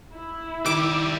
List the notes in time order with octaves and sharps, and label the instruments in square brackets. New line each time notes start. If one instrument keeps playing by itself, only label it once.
[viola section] E4
[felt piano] D#3 [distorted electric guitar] G3 E5 [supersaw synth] D6